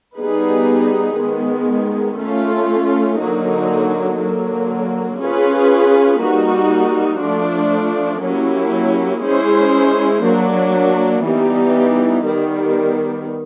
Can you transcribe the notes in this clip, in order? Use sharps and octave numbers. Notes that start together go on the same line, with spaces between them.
G3 B3 D#4 G#4 B4
D#3 G#3 B3
A3 C#4 F4
D3 F#3 A#3 D#4
D3 F#3 A#3
C#4 F4 G#4 B4
G3 A#3 D#4 F#4
F3 A3 D4
F#3 A#3 C#4 E4 G4
G#3 C#4 E4 G#4 C5
F#3 A#3 D4
E3 G3 B3 D#4 G4
D#3 G3 B3